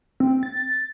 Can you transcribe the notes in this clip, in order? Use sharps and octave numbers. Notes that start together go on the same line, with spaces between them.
C4
A6